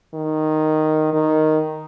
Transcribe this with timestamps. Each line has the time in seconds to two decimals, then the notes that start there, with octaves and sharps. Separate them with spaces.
0.14 D#3
1.13 D#3